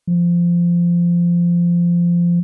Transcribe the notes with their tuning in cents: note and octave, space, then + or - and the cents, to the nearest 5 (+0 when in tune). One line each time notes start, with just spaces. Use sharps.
F3 -15